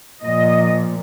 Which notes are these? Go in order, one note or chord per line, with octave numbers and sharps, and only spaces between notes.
A#2 F3 D#5